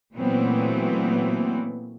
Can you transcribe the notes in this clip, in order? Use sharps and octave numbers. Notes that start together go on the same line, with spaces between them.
A#2 E3 F#3 A3 B3 C4